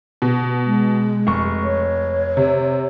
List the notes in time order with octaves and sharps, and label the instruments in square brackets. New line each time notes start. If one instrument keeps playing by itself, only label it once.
[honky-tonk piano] B2
[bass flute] G#3
[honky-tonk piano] F1 C#6
[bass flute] C#5
[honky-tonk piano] C3